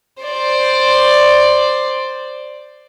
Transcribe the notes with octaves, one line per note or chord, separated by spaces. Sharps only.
C5 D5